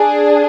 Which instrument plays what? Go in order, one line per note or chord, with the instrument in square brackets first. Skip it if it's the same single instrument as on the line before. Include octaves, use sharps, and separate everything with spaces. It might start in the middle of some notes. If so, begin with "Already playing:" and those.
Already playing: [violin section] D4 G#4